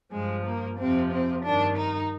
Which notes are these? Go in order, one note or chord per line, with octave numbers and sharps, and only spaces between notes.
G2 F3 G#3
A#3
F2 C3 F3 C4
C4
G2 D#3 D4
D#4